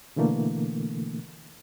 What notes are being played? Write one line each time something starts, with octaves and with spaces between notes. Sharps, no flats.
B2 D3 E3 A3 A#3